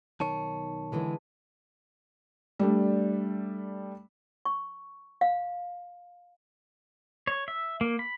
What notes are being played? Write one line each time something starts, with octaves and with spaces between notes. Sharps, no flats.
B1 D#3 C#5 A5
D3 E3 G#3
G3 A3 D4
C#6
F5
C#5
E5
A#3
B5